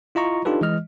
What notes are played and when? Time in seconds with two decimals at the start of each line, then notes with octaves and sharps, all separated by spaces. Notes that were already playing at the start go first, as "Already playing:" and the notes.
0.15 E4 F4 D#5 A#5 C#6
0.45 D4 D#4 F4 G4 A4 B4
0.61 E3 G#3 D#5 F6